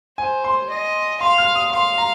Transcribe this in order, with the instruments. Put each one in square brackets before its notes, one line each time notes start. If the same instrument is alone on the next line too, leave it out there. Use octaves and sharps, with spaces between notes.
[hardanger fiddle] C5 [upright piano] G#5
[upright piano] C6
[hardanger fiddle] D#5
[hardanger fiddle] F5 [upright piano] C6
[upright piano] F6
D#6
[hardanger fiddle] F5 [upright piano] C6
[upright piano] A#5